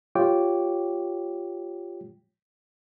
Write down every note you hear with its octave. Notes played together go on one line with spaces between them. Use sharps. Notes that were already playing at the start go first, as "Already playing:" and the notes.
F4 G4 C#5 G5 D6